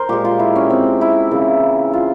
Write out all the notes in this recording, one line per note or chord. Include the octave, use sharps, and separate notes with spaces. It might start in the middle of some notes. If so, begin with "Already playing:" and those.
Already playing: A#4 C5
A#2 G#3 G4
F4
E4
C#4
C4
E4
C#3 E3 A#3
F4